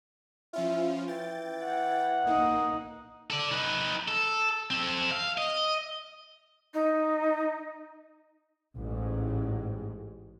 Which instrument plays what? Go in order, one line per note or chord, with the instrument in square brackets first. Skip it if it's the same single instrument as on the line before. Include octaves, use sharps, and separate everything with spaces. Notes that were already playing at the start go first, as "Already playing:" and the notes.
[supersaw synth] F3 C#4 F4 [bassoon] E4
[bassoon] E3 [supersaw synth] G5 A6
[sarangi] F#5
[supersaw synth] A#3 [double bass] D#4
[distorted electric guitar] A4 D5
D#4 B4
A4
C4 A4
F5
D#5
[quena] D#4
[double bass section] A1 G#2